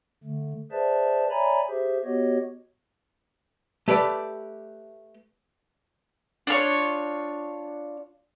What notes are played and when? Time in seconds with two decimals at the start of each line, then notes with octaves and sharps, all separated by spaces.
0.24 D3 A3
0.72 G#4 B4 C5 D5 E5 A5
1.31 C#5 D5 E5 G#5 A#5 B5
1.69 G4 G#4 C5 E5
2.05 B3 F#4 G4 C#5 D#5
3.88 A3 G4 B4 D5
6.47 D4 F4 A#4 C#5